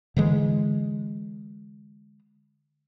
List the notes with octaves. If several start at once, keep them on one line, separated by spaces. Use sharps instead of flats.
D3 E3 G#3